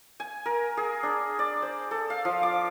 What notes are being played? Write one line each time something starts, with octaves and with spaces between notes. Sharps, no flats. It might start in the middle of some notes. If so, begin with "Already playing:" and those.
G#5
A#4
G#4
D4
D5
C5
A4
F5
F3
D6